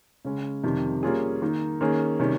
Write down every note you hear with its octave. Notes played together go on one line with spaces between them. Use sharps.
C#3 G#3 C#4
F2 C3 D#3 G3
G3 A#3 C#4 F4 G#4
D#3 A#3 D#4
D#3 A#3 C#4 G#4
C3 D#3 G3 C#4